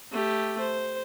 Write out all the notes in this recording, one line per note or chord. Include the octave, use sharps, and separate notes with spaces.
A3 G4
C5